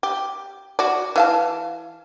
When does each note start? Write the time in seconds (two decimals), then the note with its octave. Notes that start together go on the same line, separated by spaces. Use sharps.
0.03 G4
0.79 F#4 D5
1.16 E3 F5 A5